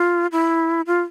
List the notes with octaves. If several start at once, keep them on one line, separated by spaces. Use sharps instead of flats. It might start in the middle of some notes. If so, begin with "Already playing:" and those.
Already playing: F4
E4
F4